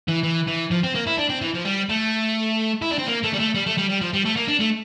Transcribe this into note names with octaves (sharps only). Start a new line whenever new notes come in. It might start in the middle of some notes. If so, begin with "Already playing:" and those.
E3
E3
E3
F3
C4
A#3
E4
D4
C4
E3
F3
G3
A3
E4
D4
C4
A#3
A3
G3
A3
G3
A3
G3
G3
F3
G3
A3
A#3
D4
A3